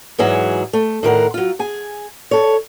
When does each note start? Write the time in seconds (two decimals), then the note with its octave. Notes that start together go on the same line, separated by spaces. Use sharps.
0.19 G#2 E3 F#3 G#4
0.73 A3
1.03 A2 D#3 A#4 F#5
1.34 F#3 F4
1.59 G#4 G#5
2.31 A4 C#5